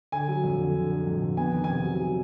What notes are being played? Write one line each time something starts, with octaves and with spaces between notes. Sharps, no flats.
D3 G#5
F#3
F2
D3
D3
D3
F2
F2
B3 G#5
D#3
G#5
C3
F#3
F#3